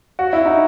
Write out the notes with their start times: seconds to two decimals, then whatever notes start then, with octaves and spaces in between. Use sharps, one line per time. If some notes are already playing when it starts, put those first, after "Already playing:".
0.19 F#4
0.33 E4
0.46 D#4